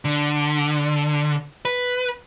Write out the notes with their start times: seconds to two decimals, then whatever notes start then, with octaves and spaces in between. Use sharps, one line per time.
0.05 D3
1.65 B4